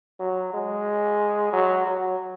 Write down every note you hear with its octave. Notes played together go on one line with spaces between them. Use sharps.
F#3
G#3
F#3
F#3